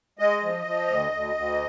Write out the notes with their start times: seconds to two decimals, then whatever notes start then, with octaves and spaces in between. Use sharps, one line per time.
0.19 G#3 D#5
0.42 F3
0.65 F3
0.88 D2
1.12 D2
1.35 D2